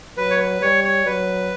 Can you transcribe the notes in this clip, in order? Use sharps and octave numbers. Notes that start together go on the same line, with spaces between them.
F#3 B4
C#5
B4
G3 C#5
C#5
F#3 B4